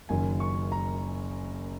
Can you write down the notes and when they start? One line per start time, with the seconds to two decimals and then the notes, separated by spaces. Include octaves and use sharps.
0.09 F#1 F#2 D#3 G#5
0.40 C#6
0.72 A#5